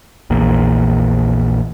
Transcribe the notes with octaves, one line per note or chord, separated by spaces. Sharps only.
A#1 E2 A#2